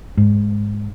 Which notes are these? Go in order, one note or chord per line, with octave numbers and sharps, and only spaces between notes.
G#2